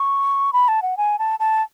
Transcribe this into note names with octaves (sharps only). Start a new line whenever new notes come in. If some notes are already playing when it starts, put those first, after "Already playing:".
Already playing: C#6
B5
A5
F#5
G#5
A5
A5